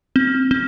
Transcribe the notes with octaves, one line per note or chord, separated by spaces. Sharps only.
C4
C4